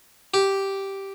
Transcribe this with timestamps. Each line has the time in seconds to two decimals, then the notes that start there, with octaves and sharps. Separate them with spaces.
0.34 G4